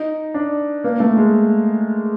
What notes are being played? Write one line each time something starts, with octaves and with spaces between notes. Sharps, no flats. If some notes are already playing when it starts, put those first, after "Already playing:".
Already playing: D#4
D4
A#3
A3
G#3